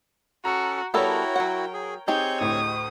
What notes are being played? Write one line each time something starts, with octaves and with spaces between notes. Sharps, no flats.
C#4 F#4 A4 A#5
G3 B3 E4 F#4 A4 A#4 C#5 G5
F#3 F#5
G#4
C4 D#4 G4 G#4 C#5 C#6 G6
D2 A2 D#6